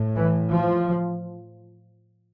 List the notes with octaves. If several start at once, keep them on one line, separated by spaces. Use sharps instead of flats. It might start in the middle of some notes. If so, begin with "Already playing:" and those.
Already playing: A2
E3
F3